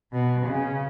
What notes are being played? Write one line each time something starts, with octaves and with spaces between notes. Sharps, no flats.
B2
C#3